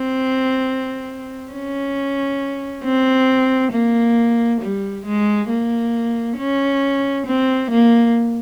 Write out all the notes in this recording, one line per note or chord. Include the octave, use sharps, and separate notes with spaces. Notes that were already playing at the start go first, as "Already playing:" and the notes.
Already playing: C4
C#4
C4
A#3
G3
G#3
A#3
C#4
C4
A#3